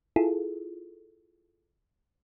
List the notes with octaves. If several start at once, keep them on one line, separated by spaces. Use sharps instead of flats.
E4 F4 G#4 A4